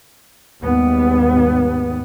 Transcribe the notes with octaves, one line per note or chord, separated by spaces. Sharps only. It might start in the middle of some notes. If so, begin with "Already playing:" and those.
D#2 G#2 G3 B3